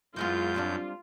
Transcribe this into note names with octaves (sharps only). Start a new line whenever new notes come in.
F#2 E3 G#3 B3 F4 G6
G3 C4 D4